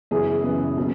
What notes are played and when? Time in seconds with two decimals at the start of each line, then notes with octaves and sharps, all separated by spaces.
0.11 F#2 C#3 E3 B3 G#4
0.44 F#2 C#3 E3 B3
0.77 B2 F#3 A#3 C#4